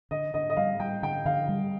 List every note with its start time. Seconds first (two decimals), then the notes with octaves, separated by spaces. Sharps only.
0.11 D3 D#5
0.34 D3 D#5
0.50 D#5
0.57 G3 F5
0.80 G3 G5
1.03 D3 G5
1.25 D3 F5
1.49 G3